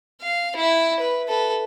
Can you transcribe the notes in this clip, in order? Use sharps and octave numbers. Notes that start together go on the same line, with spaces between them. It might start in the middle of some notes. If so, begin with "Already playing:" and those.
F5
E4 E5
B4
A4 B4